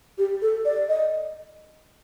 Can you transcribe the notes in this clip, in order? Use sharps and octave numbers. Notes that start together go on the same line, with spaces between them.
G4
A4
D5
D#5